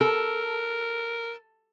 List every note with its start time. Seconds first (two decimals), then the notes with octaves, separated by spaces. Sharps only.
0.01 A4 A#4